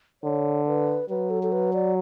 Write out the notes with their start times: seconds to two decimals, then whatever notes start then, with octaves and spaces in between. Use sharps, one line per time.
0.23 D3 C#5
0.67 B4
1.10 F#3 B4
1.30 A4
1.43 A4
1.52 B4
1.74 D5